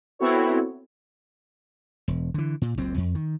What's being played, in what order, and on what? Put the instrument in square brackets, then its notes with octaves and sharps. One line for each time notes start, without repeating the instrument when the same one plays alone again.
[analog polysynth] B3 C4 E4 F#4 A4 C#5
[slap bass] E1
D3 E3
A#2
F#1 C#2 F#2 C4
F2
D#3